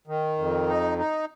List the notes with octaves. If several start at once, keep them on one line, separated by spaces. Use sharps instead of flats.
D#3
F2
D#4
D#4